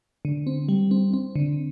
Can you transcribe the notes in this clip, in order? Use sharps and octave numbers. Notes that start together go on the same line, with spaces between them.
D3
C4
G3
C4
C4
D3